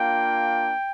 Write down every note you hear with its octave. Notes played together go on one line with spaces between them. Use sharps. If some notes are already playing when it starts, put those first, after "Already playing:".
Already playing: A#3 D4 F4 G5